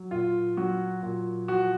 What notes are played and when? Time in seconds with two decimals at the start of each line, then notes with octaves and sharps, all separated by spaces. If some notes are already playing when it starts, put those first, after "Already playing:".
Already playing: F#3
0.11 A#2 F4
0.57 F#3 F#4
1.03 A#2
1.48 F3 F#4